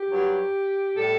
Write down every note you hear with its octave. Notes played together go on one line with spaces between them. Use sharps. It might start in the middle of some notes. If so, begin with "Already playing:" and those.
Already playing: G4
G2 F#3
A2 G3 A4